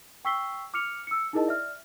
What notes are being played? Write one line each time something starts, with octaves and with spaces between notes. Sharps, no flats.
G5 C#6 E6 B6 C7 G7
D6 F6 C#7 F7
E6 C#7
D#4 E4 G#4 A#4 D#5 A5
D5 E5 F6